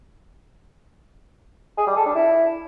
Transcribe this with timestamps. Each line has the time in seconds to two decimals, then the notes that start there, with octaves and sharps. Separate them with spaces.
1.78 G#4
1.87 G3
1.96 A4
2.06 D4
2.15 E4